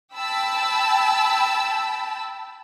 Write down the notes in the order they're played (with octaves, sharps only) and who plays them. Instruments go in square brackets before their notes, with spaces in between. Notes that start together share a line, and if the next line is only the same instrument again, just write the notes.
[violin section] G5 A5 B5 E6